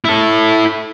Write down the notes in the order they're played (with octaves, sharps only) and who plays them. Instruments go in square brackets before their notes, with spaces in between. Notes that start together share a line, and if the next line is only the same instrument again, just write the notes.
[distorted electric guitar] E4 A4